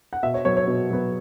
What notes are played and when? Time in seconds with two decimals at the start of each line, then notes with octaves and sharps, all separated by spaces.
0.13 F#5
0.23 B2 E5
0.34 C#5
0.45 F#3 B3 C#5
0.57 C#5
0.67 B2
0.90 F#3 B3